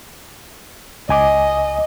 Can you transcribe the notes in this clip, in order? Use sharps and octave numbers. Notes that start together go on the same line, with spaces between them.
C#2 D#5 G#5 D6